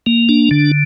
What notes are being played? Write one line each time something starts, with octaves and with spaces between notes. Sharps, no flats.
A#3
D4
D3